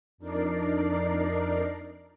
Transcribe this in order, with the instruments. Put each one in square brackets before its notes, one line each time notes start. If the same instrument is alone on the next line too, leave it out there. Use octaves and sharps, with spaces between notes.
[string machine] F2 D4 D#4 A#4 D5 C7